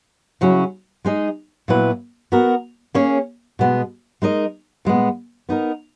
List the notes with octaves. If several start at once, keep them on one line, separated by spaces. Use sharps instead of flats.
C#3 F#3 C#4 E4
G#3 D#4 G#4 D#5
A#2 F#3 B3 E4 B4
B3 F#4 A#4
A#3 C#4 G#4 C#5
B2 G#3 B3
G#3 D#4 A#4 D#5
A#2 G#3 B3
B3 D#4 A#4